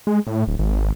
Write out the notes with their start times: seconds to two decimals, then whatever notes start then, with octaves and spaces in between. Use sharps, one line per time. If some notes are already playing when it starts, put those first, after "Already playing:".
0.07 G#3
0.27 A2
0.48 D1
0.59 G#1